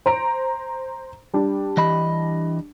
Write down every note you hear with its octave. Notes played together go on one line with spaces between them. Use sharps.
C5 A#5 D7
G3 D4
E3 D#5 B5